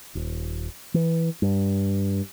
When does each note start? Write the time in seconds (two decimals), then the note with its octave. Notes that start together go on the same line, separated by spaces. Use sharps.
0.15 D#1
0.94 E3
1.42 G2